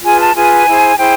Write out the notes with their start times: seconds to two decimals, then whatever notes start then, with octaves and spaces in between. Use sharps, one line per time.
0.04 F4 G#4 B4 G#5
0.19 A5
0.35 F4 G#4 B4 G#5
0.67 E4 G#4 C5
0.98 E4 G#4 C5 G5